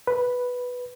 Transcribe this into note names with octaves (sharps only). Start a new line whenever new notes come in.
B4